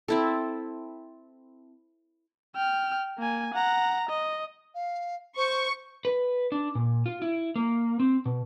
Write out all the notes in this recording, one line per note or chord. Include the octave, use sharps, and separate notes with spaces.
C4 E4 A4
G5 F6
A#3 G#5
F#5 A#5
D#5
F5
C5 C#6
B4
D4
A#2
F4
E4
A#3
C4
B2